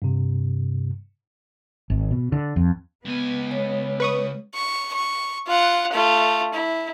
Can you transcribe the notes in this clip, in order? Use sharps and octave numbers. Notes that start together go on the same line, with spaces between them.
G2 C3
G#1
B2
D3
F2
C#2 B3 G#5
G#3 C#5
B4 C#6 D#6
C#6
C#6
F4 F#5
A3 F4
E4